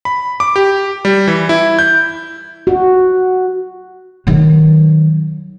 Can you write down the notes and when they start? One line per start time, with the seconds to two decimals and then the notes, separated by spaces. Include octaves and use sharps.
0.05 B5
0.40 D6
0.56 G4
1.05 G3
1.27 E3
1.49 E4
1.79 G6
2.67 F#4
4.27 D#3 F#3